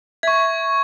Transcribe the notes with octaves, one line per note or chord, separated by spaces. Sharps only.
E5 C#6 G#6